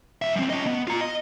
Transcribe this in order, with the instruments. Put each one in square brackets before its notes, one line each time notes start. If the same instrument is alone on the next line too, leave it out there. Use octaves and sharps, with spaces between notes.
[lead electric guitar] D#2 E5
F#2 C4
C#4 D#5
B3
F4 A#5
D#5